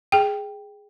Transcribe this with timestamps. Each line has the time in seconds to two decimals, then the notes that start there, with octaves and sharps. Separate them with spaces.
0.12 G#4 G5